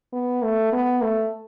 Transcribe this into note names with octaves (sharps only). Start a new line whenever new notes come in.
B3
A3
B3
A3